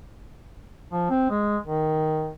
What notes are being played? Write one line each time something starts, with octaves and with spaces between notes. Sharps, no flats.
F3
C4
G#3
D#3